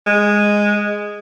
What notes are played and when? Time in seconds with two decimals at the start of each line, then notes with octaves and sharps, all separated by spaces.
0.07 G#3